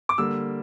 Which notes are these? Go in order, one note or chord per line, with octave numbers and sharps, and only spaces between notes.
D6
D3 G3 A#3 E6